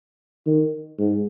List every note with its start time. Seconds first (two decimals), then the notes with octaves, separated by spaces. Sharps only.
0.46 D#3
0.98 G#2